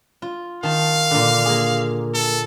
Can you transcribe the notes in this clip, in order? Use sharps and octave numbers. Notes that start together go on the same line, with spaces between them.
F4
D#3 F5 A5
A#2 D3
A#3 G#4
A4